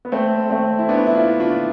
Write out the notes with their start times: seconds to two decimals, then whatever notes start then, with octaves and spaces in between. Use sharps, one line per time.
0.05 B3
0.12 A3 C4
0.50 A3 C4
0.79 E4
0.89 B3 D4
1.07 E4
1.15 D4 F4
1.40 D4 F4